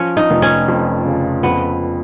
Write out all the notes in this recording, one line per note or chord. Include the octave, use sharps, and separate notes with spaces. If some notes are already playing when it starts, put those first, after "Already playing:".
Already playing: F3 C#4
D#4
F1
C#4
F2
C#3
F2 B3